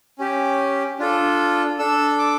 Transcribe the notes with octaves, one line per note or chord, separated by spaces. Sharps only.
C#4 G4
D4 F4 A4
D4 A4 E6
D6